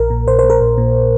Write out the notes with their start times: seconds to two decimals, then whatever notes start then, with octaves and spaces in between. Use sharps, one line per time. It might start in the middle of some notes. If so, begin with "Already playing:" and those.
Already playing: A#1 A#4
0.10 A#2
0.28 A#1 C5
0.39 A#2 C5
0.50 A#4
0.61 A#1
0.78 A#2